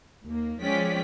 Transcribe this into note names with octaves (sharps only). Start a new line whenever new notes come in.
D#2 A#3
F3 G#3 C#4 D5 G5 B6